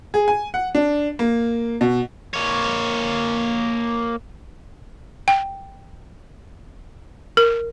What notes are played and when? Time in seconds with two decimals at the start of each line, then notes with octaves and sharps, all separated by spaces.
0.14 G#4
0.28 G#5
0.54 F#5
0.75 D4
1.19 A#3
1.81 B2
2.34 A#3 C#5
5.28 G5
7.37 A#4